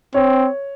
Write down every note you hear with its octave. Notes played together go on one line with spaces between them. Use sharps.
C4 C#5